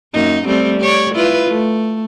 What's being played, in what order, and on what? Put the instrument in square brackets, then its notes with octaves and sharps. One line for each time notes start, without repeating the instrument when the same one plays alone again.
[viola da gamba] F#2 A#3 D#4
G3 A3 C4
G4 C#5 D5
E4 F4 B4
A3